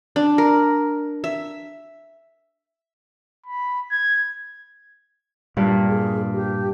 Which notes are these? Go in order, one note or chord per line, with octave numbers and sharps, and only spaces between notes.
D4
A#4
E5
B5
G#6
G2 A#2
G#4
G4